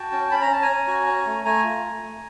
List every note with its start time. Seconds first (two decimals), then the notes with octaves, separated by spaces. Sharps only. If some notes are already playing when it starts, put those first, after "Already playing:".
Already playing: F#4 G5 A5
0.12 C#4
0.31 C#4 B5
0.41 A#5
0.50 C#4 A5
0.62 G#5 A#5
0.69 C#4
0.87 F#4
1.07 C#4
1.26 A3
1.45 A3 G#5 A#5
1.64 F4
1.83 A3
2.03 A3